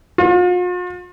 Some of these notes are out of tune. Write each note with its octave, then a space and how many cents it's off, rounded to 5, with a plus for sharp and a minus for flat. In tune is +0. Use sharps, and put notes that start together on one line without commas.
F4 +45